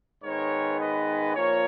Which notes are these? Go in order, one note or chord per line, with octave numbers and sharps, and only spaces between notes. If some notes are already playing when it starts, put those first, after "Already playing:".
G#2 D#3 G#3 B3 A#4 C#5
B4 D#5
A#2 F3 A#4 C#5